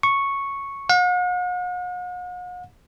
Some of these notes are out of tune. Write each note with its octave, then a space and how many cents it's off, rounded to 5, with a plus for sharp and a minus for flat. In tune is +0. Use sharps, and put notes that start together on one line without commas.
C#6 -5
F#5 -45